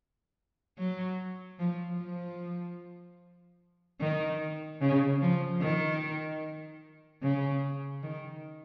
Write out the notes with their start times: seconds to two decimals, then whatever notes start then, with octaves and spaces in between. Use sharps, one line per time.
0.79 F#3
1.59 F3
2.00 F3
4.00 D#3
4.81 C#3
5.22 F3
5.61 D#3
7.23 C#3
8.03 D#3